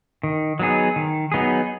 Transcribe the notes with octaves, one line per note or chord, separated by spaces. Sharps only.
D#3
F#3 B3 D#4 G#4
D#3
F#3 B3 D#4 G#4